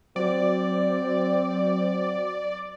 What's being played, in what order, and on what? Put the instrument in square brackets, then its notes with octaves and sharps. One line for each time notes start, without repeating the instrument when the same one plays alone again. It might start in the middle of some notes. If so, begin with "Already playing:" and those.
[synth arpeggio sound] F#3 F#4 [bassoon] C4 [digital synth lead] D5